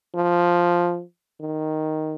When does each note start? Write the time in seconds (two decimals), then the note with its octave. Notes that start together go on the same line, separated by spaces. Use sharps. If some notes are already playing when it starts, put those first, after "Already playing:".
0.15 F3
1.40 D#3